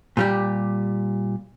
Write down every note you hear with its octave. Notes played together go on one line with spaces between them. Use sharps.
A#2 G3 G4